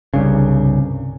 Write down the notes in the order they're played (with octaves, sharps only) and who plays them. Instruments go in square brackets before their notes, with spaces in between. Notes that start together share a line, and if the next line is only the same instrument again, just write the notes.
[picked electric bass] C2 G2 C#3